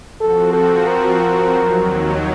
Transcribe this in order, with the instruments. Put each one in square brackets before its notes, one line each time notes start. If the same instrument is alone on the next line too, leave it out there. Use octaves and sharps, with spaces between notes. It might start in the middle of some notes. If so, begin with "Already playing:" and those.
[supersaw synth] F3 C4 F#4 [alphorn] A4
[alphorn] A4
A#4
[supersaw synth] D#2 D#3 F#3